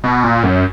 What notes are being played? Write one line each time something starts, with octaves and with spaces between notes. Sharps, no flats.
B2
A#2
F#2